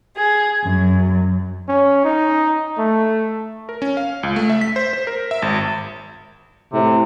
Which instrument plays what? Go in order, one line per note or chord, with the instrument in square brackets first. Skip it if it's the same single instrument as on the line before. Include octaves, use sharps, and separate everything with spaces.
[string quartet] G#4
F#2
[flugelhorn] C#4
D#4
A3
[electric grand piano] A#4
C#4
F5
C#2
A3
E5
B6
C5
C5
A#4
E5
G#1
[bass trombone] A2 [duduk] C3